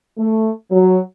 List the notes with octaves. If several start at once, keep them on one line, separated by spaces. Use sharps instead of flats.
A3
F#3